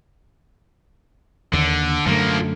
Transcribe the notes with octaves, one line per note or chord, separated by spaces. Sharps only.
D#2 D3
F#2 D3 F3 A3 A#3